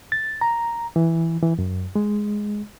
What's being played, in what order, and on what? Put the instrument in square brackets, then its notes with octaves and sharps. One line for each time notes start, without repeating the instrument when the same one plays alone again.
[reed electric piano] A6
A#5
E3
E3
F#2
G#3